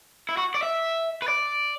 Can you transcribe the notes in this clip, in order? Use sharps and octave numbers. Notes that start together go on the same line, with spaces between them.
E4
F#4
D5
E5
B4
D5